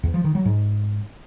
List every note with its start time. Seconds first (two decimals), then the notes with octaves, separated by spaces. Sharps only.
0.03 E2
0.14 F3
0.24 D#3
0.35 F#3
0.45 G#2